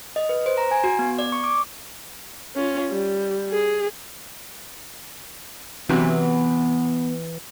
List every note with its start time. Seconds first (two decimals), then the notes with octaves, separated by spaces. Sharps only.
0.16 D#5
0.29 B4
0.46 C5
0.58 A#5
0.71 G#5
0.84 F#4
0.99 B3
1.19 D5
1.32 C#6
1.44 D6
2.56 C#4 F4
2.91 G3
3.51 G#4
5.89 C3 E3 F#3 B3